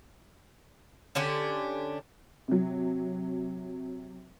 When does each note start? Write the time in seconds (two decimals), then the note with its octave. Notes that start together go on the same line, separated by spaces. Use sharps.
1.15 D3 C#4 D4 G4
2.48 C3 F#3